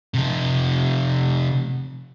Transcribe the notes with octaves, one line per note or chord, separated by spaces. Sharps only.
C3 F3